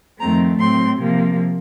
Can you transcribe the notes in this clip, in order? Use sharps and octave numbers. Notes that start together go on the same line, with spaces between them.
F2 D#3 A3 C4 A#5
A2 F#3 C4 C6
C3 F3 A#3